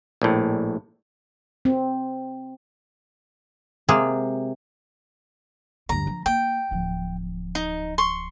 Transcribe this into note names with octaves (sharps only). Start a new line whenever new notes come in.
A#1 A2
C4
C3 G#3 A#3 G#4
D2 G2 A#5
F3
A#3 G5
D1 F3
D#4
C6 C#6